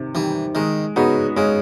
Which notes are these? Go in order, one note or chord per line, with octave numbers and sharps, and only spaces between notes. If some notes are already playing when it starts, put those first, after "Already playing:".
Already playing: C3 D#3
D#3 E3 G3
D#3 G#3
C#3 B3 D#4 F#4
C#3 G#3